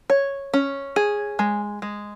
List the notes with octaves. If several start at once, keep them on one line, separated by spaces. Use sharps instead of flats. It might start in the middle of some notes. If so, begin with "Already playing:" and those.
C#5
C#4
G#4
G#3
G#3